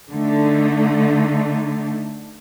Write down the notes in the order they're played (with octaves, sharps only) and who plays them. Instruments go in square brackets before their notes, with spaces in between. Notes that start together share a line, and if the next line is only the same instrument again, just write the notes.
[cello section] D3 A3 D#4